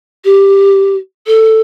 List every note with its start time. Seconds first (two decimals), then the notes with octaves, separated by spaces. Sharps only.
0.25 G4
1.26 A4